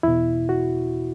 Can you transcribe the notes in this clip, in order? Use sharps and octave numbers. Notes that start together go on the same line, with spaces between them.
E2 B2 E4
F#4